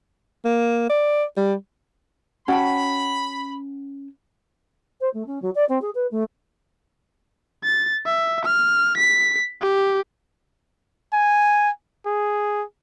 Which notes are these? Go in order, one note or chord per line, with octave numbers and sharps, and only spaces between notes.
A#3
D5
G3
C#4 F#4 C#5 F#5 G5 A5 B5
C5
A3
C#4
F#3
D5
C4
G#4
B4
A3
A6
E5
F6
B6
G4
G#5
G#4